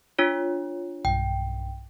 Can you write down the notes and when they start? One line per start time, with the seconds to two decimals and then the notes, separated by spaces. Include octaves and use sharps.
0.19 D4 F4 C#5
1.05 B1 G2 G5